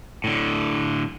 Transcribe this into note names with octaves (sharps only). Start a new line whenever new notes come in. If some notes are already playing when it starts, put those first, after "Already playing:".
A2 D3